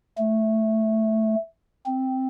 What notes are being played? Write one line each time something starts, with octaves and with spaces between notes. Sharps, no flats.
A3
C4